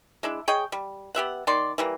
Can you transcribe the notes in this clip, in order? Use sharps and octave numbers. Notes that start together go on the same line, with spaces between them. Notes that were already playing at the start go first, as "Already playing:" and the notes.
G#3 D4 E4
G#4 C#5 D#5 G5
G3
B3 G4 E5 F#5
D#3 A#3 D5 C6
E3 G3 A#3